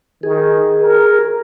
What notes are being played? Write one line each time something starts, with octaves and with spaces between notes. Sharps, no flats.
D#3 G#4
A#4